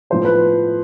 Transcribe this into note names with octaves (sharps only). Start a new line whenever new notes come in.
A2 F3 B3 C5
B4